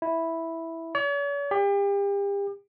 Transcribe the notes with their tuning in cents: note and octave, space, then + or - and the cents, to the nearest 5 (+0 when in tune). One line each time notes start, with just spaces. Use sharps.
E4 -5
C#5 +45
G4 +35